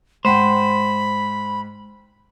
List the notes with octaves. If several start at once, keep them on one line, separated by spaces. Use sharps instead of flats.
G#2 C5 F#5 G5 B5